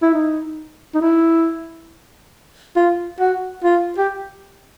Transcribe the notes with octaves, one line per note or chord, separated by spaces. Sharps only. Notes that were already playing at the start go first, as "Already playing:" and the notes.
E4
D#4
D#4
E4
F4
F#4
F4
G4